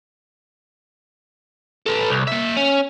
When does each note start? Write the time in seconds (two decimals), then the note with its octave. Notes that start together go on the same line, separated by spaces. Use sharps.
1.87 A4 B4
2.11 C2
2.28 A#3 E5
2.57 C#4